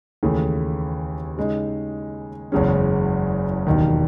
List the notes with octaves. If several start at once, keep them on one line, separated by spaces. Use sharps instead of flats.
D#2 C#3 E3 A3
C#3 G#3 D#4
F#1 E2 C#3 G#3 C#4
E1 D#2 D#3